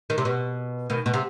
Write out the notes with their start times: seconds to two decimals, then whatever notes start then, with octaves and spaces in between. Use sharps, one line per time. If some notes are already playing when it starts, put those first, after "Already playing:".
0.10 D#3
0.18 C3
0.25 B2
0.90 B2 D#3
1.06 B2
1.14 C3